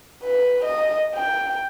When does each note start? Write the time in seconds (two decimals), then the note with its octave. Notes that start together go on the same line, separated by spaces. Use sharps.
0.23 B4
0.65 D#5
1.15 G5